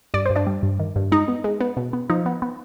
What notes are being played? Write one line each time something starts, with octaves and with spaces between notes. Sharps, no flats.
G2 D5
G2 C5
D4 D5
G3
G2
D#3
G2
G#3 D#4
B3
G#3
B3
B2
B3
F3 D#4
B3
B3